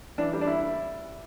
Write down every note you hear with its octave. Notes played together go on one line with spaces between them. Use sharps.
E3 D4
G3
D4
E4